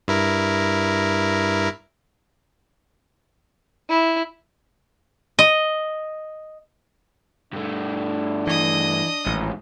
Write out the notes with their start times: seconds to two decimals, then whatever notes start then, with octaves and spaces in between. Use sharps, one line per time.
0.08 G2 E4 A#4
3.89 E4
5.39 D#5
7.53 G2 A3 D4
8.47 E3 D#5 D#6
9.26 A1 D#2 G#2